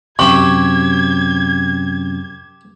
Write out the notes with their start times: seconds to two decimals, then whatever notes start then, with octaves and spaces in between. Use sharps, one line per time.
0.19 F#2 C3 G4 E5 C#6 G#6